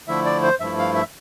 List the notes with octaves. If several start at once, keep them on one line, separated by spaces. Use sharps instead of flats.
D3 F3 A3 E4 E5
D5
C5
G2 F3 A3 E4 E5
F5
E5